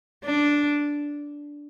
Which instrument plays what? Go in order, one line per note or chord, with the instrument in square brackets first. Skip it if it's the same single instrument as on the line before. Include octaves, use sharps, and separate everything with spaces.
[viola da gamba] D4